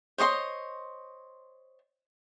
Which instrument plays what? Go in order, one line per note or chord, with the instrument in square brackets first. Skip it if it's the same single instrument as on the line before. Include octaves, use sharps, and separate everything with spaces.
[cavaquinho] C5 C#5 D#5 C6